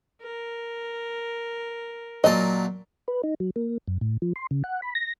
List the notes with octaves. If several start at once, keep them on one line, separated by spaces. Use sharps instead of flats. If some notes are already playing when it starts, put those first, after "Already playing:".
A#4
A#2 F#3 D#5 A5
B4
D#4
F#3
A#3
F#2
A2
F3
C6
C#3
F#5
B5
A#6